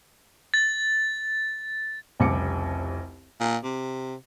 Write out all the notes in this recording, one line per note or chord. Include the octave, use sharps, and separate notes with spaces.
A6
F1 C2 C#3 D6 C#7
A#2
C3